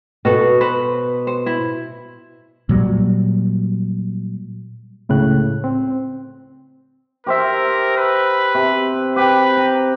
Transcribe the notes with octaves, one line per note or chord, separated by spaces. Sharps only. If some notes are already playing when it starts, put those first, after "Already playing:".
B2 F#4 A4
B4 C5
C5
E4
A#2 F#3 G3
C#2 A2 C#3 F#6
C4
G4 A#4 C5 E5
B4
C3
G4 B4 G5
A#5